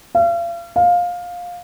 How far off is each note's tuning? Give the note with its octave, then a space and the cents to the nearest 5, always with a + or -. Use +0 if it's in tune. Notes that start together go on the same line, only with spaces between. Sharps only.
F5 -40
F5 +15